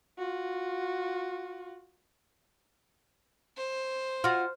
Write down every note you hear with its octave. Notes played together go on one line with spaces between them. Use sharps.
F4 F#4
C5
F4 F#4 C6 F6